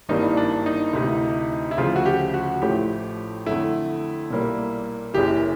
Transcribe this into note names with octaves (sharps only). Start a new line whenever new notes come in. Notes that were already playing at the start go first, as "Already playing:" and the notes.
G#1 G2 E3 G3 A#3 D#4
D4
D#4
D2 C3 E3
E4
D2 C#3 F3 F4
F#4
G4
F#4
A1 A2 F3 A3 G4
F2 D3 F#3 A3 E4
B1 A#2 G3 A#3
F#1 F#2 C#3 E3 G4